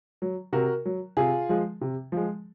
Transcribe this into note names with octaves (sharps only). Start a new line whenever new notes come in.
F#3
C3 F#4 A#4
F#3
C3 F4 G#4
F3 G#3
C3
F3 G#3